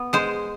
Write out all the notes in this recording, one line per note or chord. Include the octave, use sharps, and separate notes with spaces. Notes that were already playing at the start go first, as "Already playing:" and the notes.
Already playing: B3
G#3 C5